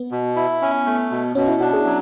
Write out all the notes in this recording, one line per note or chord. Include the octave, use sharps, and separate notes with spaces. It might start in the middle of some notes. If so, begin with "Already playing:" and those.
Already playing: B3
B2
E4
C#4
A3
B2
B2 C#4
E4
D4 F#4
G#4
F#3 F#4